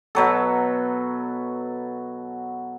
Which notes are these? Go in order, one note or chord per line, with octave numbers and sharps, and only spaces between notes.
B2 F#3 A4